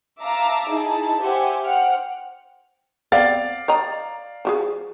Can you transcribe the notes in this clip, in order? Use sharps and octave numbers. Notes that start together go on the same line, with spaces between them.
E5 F5 A5 A#5 D6 E6
D#4 E4 G#4 A5
G4 C5 E5 F#5 G#5
C5 F#5 G5 F6
B3 C4 D5 F5 A6
C#5 D#5 A#5
F3 G4 G#4